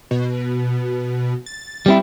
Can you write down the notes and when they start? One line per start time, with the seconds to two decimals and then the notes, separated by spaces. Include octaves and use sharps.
0.11 B2
1.46 A6
1.86 G3 C4 E4